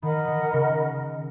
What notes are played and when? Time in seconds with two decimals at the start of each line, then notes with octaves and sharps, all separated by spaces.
0.02 D#3 A#4 D#5 F#5 B5
0.28 D#3
0.53 C#3